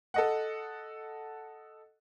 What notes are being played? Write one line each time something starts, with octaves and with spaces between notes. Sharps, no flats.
A4 D#5 F#5